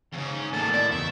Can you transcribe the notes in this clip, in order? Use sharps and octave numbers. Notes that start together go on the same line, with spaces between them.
E2 G#2 C#3
C#4
E2 A2 C3 D#3 A#3 A4 A5 F6
E4 D5
E2 C#3 E5